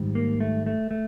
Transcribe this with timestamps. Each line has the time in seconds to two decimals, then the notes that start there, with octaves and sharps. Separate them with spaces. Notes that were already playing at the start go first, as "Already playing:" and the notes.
Already playing: G#2 D#3 G3
0.15 A#3
0.40 A3
0.66 A3
0.91 A3